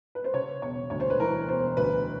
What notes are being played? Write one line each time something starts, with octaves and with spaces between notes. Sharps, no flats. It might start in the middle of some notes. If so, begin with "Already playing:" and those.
B4
C5
C#3 C#5
E1 C#5
D2 C#5
C5
B4
E3 A#4
E1 C5
D2 B4